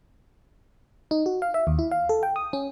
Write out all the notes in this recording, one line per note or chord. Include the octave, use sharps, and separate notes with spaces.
D#4
F#4
F5
E5
D#2
E4
F5
A4
G5
D#6
C#4